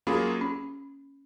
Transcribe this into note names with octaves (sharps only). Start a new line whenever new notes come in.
F#3 A#3 C#4 F4 G#4
C#4